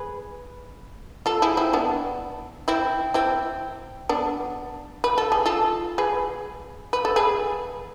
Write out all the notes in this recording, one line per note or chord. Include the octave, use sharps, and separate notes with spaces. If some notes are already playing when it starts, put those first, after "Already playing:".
Already playing: G#4 B4
F4 A4
E4 G#4
C4 E4
B3 D4
C4 E4
C4 E4
B3 D4
B4
A4
G#4
F4 A4
G#4 B4
B4
A4
G#4 B4